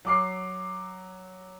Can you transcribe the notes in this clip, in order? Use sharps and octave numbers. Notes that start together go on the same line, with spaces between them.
F#3 D6 C7